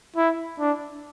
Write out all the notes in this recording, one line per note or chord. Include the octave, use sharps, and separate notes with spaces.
E4
D4